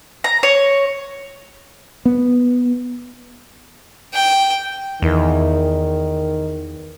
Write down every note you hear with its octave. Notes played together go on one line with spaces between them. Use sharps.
A#5
C#5
B3
G5
E2 D#3